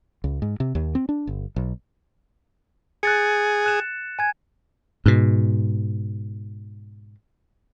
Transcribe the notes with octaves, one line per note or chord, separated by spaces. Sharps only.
C#2
G#2
C3
D#2
C4
D4
G1
B1
G#4 F#6 A6 C#7
F#6 E7
G#5 G#6
G#2 B2